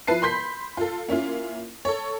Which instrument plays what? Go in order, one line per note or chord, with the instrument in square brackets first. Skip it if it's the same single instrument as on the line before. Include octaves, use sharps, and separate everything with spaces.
[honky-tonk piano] F3 E4 B4 A5 C7
B5 C6 G6 B6
F4 A4
A#3 C#4 E4 F4
A4 C#5